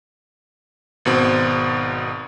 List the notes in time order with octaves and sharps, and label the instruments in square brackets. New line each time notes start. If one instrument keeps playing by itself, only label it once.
[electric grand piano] G#1 B2 C4